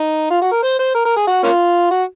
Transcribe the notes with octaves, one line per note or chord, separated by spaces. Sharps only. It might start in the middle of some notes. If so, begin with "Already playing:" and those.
Already playing: D#4
F4
F#4
A#4
C5
C5
A#4
A#4
G#4
F#4
A#3 C#4 F4
F#4